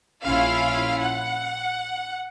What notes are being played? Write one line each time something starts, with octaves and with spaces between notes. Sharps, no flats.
A#1 C#4 E4 F4 F5
F#5